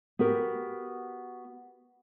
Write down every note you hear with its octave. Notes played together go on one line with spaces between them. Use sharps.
B3 F#4 G4 A#4